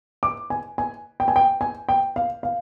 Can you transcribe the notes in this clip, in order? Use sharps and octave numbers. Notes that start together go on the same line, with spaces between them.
D6
G#5
G#5
G5
G#5
G5
G#5
G5
F5
F5